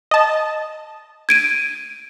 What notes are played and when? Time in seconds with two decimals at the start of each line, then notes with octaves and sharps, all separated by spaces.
0.11 D#5 A5
1.29 G#6 D7 D#7